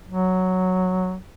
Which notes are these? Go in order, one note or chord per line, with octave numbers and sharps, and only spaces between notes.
F#3